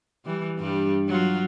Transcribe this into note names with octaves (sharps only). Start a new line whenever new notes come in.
E3 G3
G2 G3
F#3 F4